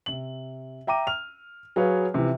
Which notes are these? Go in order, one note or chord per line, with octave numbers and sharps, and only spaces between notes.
C3 F#7
E5 G5 A#5 D6 D#7
F6 F7
F#3 G#4 B4 C#5 F5
C3 E3 F3